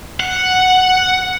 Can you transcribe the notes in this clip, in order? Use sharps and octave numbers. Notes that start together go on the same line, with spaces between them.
F#5